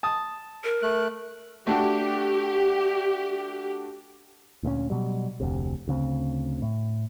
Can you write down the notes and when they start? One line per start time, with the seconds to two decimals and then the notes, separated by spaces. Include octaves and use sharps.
0.03 A5 D#6
0.64 A#4
0.82 A3 F#6
1.67 A3 D4 F#4 G4
4.63 D2 A#2 A3 C#4
4.90 B2 F#3 G3
5.40 F1 D2 C3
5.88 D2 C#3 C4
6.62 A2